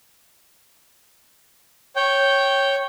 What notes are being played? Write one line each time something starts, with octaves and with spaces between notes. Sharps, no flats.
C#5 G5